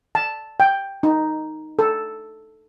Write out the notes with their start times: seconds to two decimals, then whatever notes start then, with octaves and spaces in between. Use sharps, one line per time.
0.15 A5
0.60 G5
1.03 D#4
1.79 A4